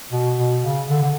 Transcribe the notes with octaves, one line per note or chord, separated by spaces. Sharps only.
B2
B2
C#3
D3
D3